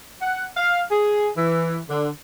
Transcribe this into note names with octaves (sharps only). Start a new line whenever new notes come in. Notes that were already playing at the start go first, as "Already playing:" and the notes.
F#5
F5
G#4
E3
D3